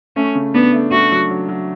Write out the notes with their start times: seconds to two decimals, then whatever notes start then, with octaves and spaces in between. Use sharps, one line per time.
0.16 A3 C#4
0.35 C#3
0.54 B3 D4
0.73 A3
0.92 A3 F#4
1.12 F#3
1.30 F#3
1.49 F#3